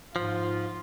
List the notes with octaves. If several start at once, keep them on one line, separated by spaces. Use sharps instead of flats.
G#2 F3 F4